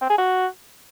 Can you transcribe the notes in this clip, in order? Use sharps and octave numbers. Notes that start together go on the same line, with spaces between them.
C4
G#4
F#4